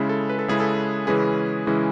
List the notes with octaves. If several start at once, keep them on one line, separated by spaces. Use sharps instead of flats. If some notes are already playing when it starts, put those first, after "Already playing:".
Already playing: C#3 G#3 C#4 E4
A4
B4
A4
C#3 G#3 C#4 E4 G#4
A4
C#3 E3 G#3 C#4 E4 G#4 B4
C#3 E3 G#3 C#4 E4